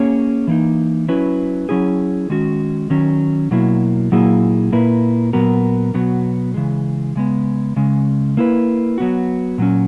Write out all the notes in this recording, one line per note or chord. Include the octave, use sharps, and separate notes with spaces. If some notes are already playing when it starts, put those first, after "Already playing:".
Already playing: A#3 C#4 G#4 C#5
E3 A#3 D#4
F#3 C#4 E4 B4
F#3 C#4 E4 G#4
D#3 G#3 C#4 F#4
D#3 F#3 C#4
B2 F#3 A#3 E4
A#2 F#3 A#3 E4 G#4
A#2 A#3 E4 B4
A#2 F#3 B3 F#4 A#4
B2 F#3 B3 F#4
C#3 E3 G#3
C#3 G#3 B3
C#3 G#3 C#4
A#3 E4 B4
F#3 B3 F#4
A#2 F#3 C#4